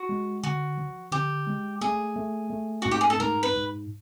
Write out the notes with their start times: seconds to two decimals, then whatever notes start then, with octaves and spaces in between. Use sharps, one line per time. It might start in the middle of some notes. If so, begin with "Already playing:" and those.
Already playing: F#4
0.09 G#3
0.43 D3 F#4
0.78 F3
1.12 D3 G4
1.47 G#3
1.81 A3 G#4
2.16 A3
2.50 A3
2.82 G#2 F#4
2.91 G4
3.01 G#4
3.10 A4
3.19 G#2 A#4
3.43 B4
3.54 G#2